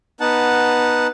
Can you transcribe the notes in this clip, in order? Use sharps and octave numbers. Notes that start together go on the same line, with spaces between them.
B3 D#4 F#5 A5